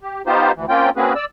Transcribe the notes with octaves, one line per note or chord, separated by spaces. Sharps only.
G4
B3 D#4 F4 G4 C5
D2 E3
A#3 C4 C#4 F4 G5
A#3 C4 C#4 F#4 G#4 B4
D5 E6